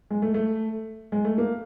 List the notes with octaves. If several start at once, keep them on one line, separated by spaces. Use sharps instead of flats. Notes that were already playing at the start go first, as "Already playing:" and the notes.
G#3
A3
A3
G#3
A3
A#3